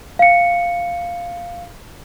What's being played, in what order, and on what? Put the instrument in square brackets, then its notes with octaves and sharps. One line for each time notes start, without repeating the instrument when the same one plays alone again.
[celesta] F5 C#7